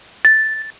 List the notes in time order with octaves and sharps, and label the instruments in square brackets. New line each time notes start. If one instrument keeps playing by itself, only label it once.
[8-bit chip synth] A6